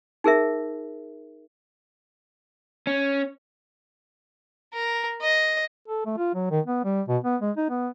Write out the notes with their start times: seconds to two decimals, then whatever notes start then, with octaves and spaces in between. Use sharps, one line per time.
0.24 D#4 G#4 A#4 E5
2.87 C#4
4.73 A#4
5.22 D#5
5.88 A4
6.06 A3
6.18 F4
6.35 F#3
6.51 D#3
6.66 B3
6.84 G3
7.08 B2
7.24 B3
7.41 G#3
7.57 D#4
7.70 B3